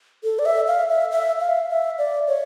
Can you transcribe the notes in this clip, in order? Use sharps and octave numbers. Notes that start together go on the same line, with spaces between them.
A4
D5
E5
F5
E5
E5
F5
E5
D5
C#5